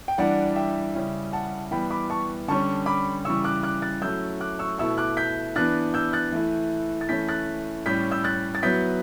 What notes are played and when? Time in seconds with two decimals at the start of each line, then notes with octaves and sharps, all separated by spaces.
0.08 G5
0.18 E3 G3 D4 D5 F#5
0.56 E5 G5
0.95 C#3 G3 C#4 E4
1.33 F#5 A5
1.71 E3 G3 B3 G5 B5
1.90 B5 D6
2.10 A5 C#6
2.48 D3 G3 C#4 A5 C#6
2.86 B5 D6
3.25 C#3 E3 G3 C#6 E6
3.44 D6 F#6
3.63 D6 F#6
3.82 F#6 A6
4.02 F#3 A3 C#4 E4 E6 G6
4.41 D6 F#6
4.59 C#6 E6
4.78 B2 A3 E4 C#6 E6
4.98 D6 F#6
5.17 G6 B6
5.56 E3 B3 D4 F#6 A6
5.94 E6 G6
6.13 F#6 A6
6.32 E3 A3 E4
7.01 A6
7.09 E3 A3 C#4 E4 G6 B6
7.29 F#6 A6
7.86 A2 G3 C#4 G6 B6
8.12 E6 G6
8.24 F#6 A6
8.55 A6
8.63 F#3 B3 E4 G6 B6